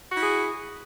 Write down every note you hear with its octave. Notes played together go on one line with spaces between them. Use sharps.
E4 F#4 G#4